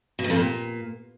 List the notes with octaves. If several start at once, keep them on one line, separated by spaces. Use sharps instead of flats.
B2
G2
F2
A#2